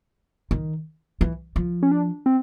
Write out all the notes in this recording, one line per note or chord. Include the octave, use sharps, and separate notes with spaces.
D#3
E3
F3
C#4
D4
C4